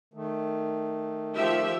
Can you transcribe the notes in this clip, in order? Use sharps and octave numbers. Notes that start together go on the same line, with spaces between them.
D#3 A3
F3 G4 E5